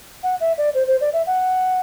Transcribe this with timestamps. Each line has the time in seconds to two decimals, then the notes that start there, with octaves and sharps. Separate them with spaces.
0.23 F#5
0.41 E5
0.58 D5
0.74 C5
0.88 C5
1.01 D5
1.13 E5
1.27 F#5